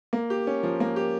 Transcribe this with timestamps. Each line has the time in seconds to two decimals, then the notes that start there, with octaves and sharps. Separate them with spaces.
0.13 A#3
0.30 G4
0.47 C#4
0.63 F3
0.80 A#3
0.96 G4